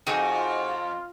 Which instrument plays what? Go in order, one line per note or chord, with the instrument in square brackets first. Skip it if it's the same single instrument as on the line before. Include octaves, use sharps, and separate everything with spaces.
[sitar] F2 [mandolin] D#4 F#4 G#4
[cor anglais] F4